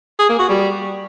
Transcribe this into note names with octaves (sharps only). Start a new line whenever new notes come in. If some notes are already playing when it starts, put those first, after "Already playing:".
G#4
A#3
F#4
G3